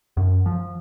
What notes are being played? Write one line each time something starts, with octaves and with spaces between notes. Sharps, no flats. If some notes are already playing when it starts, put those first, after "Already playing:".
F#2
F3